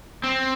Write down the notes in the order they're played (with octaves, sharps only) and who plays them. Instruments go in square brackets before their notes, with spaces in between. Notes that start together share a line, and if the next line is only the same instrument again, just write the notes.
[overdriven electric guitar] C4